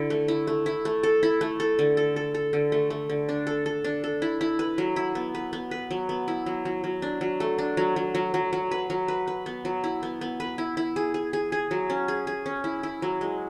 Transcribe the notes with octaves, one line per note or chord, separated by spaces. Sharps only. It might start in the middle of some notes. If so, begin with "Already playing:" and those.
Already playing: D3 E4
A3
E4
A3
E4
A3
A4
E4
A3
A4
D3
A4
A4
A4
D3
A3
A3
D3
D4
A4
A4
D4
A4
E4
E4
B4
F#3
E4
B3
B4
B3
B4
F#3
B3
E4
F#3
F#3
F#3
D4
F#3
A3
D4
F#3
F#3
F#3
F#3
F#3
B4
F#3
B4
B4
B3
F#3
E4
B3
B3
B4
E4
E4
G#4
G#4
G#4
G#4
F#3
C#4
G#4
G#4
C#4
E4
E4
F#3
G#3